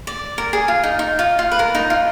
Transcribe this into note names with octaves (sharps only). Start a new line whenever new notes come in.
D5
A#4
G#4
F4
D#4
D#4
F4
F4
B4
A#4
D#4
F4